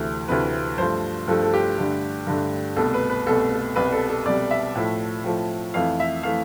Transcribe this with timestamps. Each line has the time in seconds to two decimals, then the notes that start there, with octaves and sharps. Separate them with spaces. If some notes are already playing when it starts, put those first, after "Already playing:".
Already playing: D2 C3 E3 A3
0.29 D2 C3 E3 A3 B4
0.78 G2 F3 A3 C5
1.28 G2 F3 A3 A4
1.43 A4
1.53 G4
1.78 G2 D3 A3
2.27 G2 D3 A3
2.76 C2 B2 A3 A4
2.94 B4
3.10 B4
3.27 C2 B2 A3 A4
3.52 A4
3.76 C2 B2 G3 B4
3.92 A4
4.09 A4
4.26 C2 B2 G3 D5
4.51 E5
4.75 A2 F3 A3
5.24 A2 F3 A3
5.74 F2 E3 A3 F5
6.00 E5
6.23 E3 A3 F5